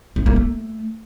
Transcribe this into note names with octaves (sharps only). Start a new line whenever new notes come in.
C4
A#3
A3